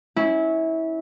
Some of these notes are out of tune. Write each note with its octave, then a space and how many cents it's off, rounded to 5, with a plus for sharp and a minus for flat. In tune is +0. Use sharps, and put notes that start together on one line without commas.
C#4 +0 E4 -25